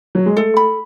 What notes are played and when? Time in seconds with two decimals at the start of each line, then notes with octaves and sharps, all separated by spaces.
0.15 F#3
0.26 G#3
0.37 A3 A4
0.57 B5